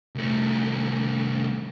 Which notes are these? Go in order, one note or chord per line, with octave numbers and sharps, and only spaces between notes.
C2 A3